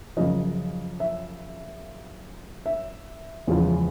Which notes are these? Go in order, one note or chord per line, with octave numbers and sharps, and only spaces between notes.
F#2 C#3 F3 D#5
E5
E5
E2 C#3 F3 G#3